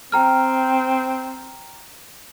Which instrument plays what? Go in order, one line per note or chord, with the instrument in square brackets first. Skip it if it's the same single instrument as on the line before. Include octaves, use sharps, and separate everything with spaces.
[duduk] C4 [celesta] G5 A#5 F6